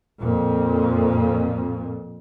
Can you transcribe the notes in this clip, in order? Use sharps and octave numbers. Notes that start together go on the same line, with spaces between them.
F2 A#2